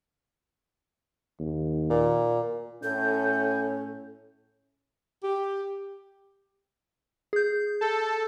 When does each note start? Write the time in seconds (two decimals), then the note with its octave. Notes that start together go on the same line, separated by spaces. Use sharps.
1.40 D#2
1.90 A#2
2.83 A2 C#4 A4 G6
5.23 G4
7.33 G#4 G6
7.81 A4